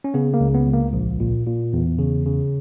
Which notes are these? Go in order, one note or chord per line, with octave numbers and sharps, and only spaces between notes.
C#4
C#3 B3
A#3
C#2
B3
C#2
A#3
A#1
A#2
A#2
E2
C#3
C#3